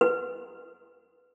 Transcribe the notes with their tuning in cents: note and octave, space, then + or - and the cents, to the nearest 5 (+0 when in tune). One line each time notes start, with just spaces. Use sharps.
B4 +10